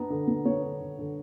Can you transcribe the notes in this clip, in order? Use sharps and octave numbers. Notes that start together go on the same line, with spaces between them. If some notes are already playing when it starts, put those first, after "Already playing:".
Already playing: B3 D4 A#5
D3
B3
B3 C#5
D3
D3
D3